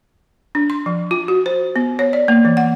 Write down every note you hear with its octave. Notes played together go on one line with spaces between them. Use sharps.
D4
C6
F3
F4
F#4
C5
B3
C#5
D5
A#3
E3
F#5